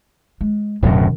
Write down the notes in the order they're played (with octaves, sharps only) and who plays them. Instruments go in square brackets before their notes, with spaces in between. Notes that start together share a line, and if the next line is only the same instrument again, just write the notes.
[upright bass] G#3
[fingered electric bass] D1 F#2 [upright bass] B2 D#3